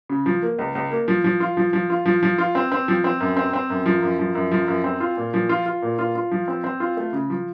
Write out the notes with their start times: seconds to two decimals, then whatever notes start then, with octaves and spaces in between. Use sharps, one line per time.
0.09 C#3
0.26 F3
0.42 A#3
0.59 C#2
0.75 C#2
0.91 A#3
1.08 F3
1.24 F3
1.40 F4
1.57 F3
1.73 F3
1.90 F4
2.06 F3
2.23 F3
2.38 F4
2.55 C4
2.72 C4
2.88 F3
3.04 C4
3.20 F#2
3.37 C4
3.53 C4
3.70 F#2
3.86 F3
4.02 F#2
4.19 F3
4.35 F#2
4.51 F3
4.68 F#2
4.84 C4
5.00 F4
5.17 A#2
5.34 F3
5.49 F4
5.66 F4
5.82 A#2
5.99 F4
6.15 F4
6.31 F3
6.48 C4
6.64 C4
6.80 F4
6.97 A3
7.13 C#3
7.30 F3